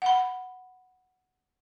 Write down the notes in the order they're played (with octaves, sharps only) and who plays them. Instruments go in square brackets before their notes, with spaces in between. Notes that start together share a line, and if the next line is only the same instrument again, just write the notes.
[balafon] F#5 B5